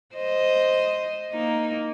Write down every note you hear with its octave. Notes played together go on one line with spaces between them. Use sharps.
C5 D#5
A#3 D#4